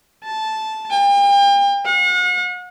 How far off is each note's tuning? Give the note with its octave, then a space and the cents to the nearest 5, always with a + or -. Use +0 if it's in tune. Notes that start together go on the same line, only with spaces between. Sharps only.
A5 -10
G5 +40
F#5 -40